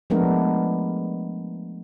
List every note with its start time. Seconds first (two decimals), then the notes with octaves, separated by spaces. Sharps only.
0.10 F3 G#3 A3 B3 D4 A#4